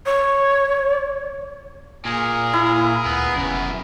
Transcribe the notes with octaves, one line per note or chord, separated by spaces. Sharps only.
C#5
A#2 G#4 A#4
E4
D2 B3
F1 F#2 B3